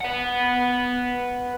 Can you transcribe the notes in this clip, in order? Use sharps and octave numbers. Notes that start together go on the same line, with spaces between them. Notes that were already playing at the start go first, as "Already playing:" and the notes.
B4 F#5